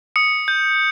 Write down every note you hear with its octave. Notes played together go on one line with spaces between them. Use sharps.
D#6 C#7
G6